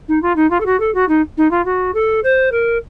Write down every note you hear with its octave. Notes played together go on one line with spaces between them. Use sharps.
D#4
F4
D#4
F4
A4
F#4
A4
F#4
D#4
D#4
F4
F#4
A4
C5
A#4